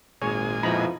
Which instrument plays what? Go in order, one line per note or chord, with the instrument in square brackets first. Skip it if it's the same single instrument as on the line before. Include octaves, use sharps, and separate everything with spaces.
[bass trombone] G#1 [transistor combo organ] A#2 G#3 G#5 [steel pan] G#4 C#5
[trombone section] F2 B2 E4 [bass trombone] F3 [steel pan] D#4 A#5 B5